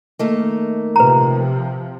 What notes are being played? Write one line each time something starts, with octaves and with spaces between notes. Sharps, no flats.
D#3 A3 A#3
C3 F3 B4 A#5